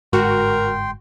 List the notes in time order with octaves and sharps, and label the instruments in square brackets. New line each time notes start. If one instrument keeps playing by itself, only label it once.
[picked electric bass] G1 G#2 G#3 [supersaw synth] F#4 [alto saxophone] A#4 [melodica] G5 C6